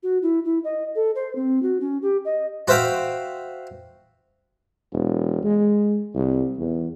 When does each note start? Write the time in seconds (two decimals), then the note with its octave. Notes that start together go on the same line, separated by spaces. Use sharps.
0.03 F#4
0.22 E4
0.45 E4
0.64 D#5
0.95 A4
1.15 C5
1.35 C4
1.62 F#4
1.80 C#4
2.02 G4
2.25 D#5
2.68 F#4 C5 E5 F5 G5
4.93 E1
5.43 G#3
6.14 C2
6.58 E2